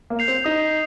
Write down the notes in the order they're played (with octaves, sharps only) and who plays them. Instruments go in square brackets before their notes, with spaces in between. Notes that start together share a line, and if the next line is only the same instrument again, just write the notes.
[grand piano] A#3
[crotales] G6 C7 F7
[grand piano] C4
[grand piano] D#4 [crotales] D#6